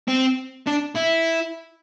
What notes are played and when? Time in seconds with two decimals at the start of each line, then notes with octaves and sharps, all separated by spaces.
0.08 C4
0.67 D4
0.95 E4